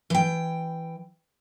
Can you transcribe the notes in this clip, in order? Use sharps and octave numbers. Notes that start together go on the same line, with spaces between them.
E3 G5